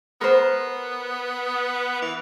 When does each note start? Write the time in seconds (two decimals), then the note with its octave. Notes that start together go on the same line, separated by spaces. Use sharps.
0.21 B3 A#4 C5
2.02 E3